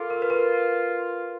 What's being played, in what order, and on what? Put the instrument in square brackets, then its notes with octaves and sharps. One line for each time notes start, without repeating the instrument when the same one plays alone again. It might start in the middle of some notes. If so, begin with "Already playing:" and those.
Already playing: [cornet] F4 [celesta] A4 A#4
[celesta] A#4
B4
A#4